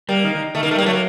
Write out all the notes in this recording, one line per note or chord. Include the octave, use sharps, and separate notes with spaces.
G3 A#3
D#3
D#3
D#3 A3
A#3
D#3
A3
G3 A#3
F#3 A3
A#3